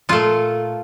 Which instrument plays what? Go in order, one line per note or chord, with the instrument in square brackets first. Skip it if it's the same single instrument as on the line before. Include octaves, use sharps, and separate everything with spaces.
[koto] A#2 A3 F4